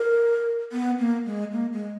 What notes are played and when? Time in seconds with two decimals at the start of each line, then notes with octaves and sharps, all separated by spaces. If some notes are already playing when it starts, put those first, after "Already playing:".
Already playing: A#4
0.72 B3
0.99 A#3
1.25 G#3
1.52 A#3
1.73 G#3